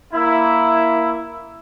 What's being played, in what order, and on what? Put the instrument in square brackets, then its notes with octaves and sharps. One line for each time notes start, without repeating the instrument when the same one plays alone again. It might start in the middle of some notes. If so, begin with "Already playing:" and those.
[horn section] A#3 E4